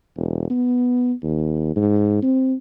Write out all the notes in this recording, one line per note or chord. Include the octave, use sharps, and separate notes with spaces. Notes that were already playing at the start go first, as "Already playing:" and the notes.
E1
B3
D#2
G#2
C4